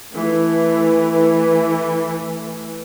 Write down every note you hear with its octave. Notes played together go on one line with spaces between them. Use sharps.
E3 A3